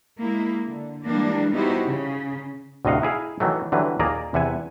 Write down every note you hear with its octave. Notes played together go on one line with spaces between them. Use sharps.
G#3 A#3 E4
D3
E3 G3 G#3 A#3 D4
B3 D#4 E4 F#4 G4 C5
C#3
D2 A2 C3 D#5 F5 F#5
D#4 E4 G#4 F5
D#3 E3 F#3 A3
D3 E3 F#3 G3 B4
D#2 A#2 A#3 G#4 D5 A#5
E2 C3 E5 F#5 G#5